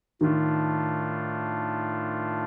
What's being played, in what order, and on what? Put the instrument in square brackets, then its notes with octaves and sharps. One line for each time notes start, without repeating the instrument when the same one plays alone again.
[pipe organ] A2 A3 D4 F4 [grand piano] D#3